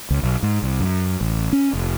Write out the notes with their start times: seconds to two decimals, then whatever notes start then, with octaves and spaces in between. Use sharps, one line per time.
0.11 C#2
0.23 B1
0.43 G#2
0.62 C2
0.80 F#2
1.21 A1
1.53 C#4
1.73 F1